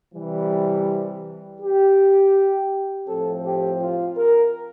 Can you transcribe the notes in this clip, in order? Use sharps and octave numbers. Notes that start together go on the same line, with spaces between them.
C3 E3 G3
G4
A2 F3 C4 A4
G4
F4
A#4